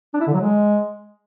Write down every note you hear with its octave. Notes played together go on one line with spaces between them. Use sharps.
D4
E4
D3
F#3
G#3